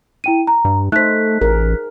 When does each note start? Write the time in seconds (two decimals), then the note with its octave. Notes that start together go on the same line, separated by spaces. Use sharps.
0.24 E4 G5 D#7
0.47 A#5
0.65 G2
0.92 A3 D#4 C5 F#6 B6
1.41 A1 G#4 A#4